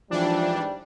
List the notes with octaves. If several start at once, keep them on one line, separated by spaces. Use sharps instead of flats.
G#2 E3 F3 G3 D4